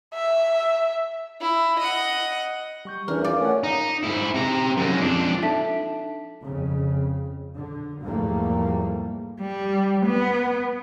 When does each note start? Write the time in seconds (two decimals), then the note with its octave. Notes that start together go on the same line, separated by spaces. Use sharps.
0.14 E5
1.41 E4
1.80 D#5 F#5
2.85 G3 C#6 G6
3.08 E2 E3 C#4 D4 A#4
3.24 F4 D5 F5
3.41 A3 C#4 F#5
3.64 D#4
4.04 G#2 E4
4.35 C3 A#5
4.77 F#2 G#3
5.00 F2 D4
5.42 D4 D#4 A4 E5 A5 B6
6.43 F2 C#3
7.55 D3
8.02 E2 G#2 F3 G3 A3 A#3
9.41 G3
10.06 B3